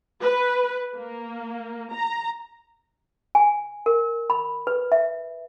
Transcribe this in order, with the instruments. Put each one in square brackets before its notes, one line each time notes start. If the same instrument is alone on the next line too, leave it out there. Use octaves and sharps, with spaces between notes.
[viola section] B4
A#3
A#5
[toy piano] G#5
A#4
B5
B4
E5